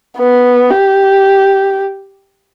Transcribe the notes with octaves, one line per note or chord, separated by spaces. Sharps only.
B3
G4